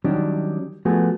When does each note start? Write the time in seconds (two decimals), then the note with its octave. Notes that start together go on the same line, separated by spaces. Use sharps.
0.04 D#3 F#3 G3 C#4 D4
0.85 F3 A3 B3 F#4 G#4